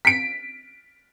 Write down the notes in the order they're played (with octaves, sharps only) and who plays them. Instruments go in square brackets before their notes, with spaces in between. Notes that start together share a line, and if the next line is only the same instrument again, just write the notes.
[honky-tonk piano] B6 D7